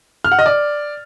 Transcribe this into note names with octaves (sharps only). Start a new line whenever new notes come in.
F6
F#5
D#5
D5